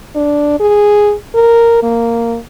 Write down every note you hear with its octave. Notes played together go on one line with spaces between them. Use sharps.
D4
G#4
A#4
A#3